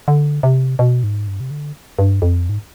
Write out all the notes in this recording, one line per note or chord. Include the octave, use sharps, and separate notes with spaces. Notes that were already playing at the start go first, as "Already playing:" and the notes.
D3
C3
B2
G#2
G2
C3
D3
G2
F2
G#2